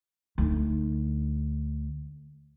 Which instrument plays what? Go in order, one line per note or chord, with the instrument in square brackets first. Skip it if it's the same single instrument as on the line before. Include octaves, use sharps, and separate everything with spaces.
[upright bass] D2 D#4